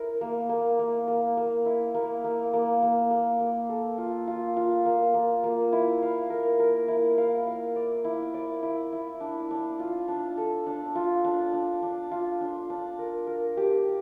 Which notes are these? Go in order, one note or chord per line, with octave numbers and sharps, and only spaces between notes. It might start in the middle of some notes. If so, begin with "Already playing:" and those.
Already playing: E4 A#4
A#3
A#3
A#3
A#3
A#3
E4
A#3
A#3
A#3
A#3
A#3
A#3
A4
F4
F4
F4
A#3
A#3
A#3
E4
F5
A#4
A#4
E4
F5
F5
D5
E4
D5
E4
E4
D4
D4
F4
D4
A4
D4
F4
D4
D4
D4
F4
D4
D4
A#4
A#4
G4